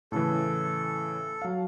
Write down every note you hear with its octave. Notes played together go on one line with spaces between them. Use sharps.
A2 C#3 E3 A4
F#3 F5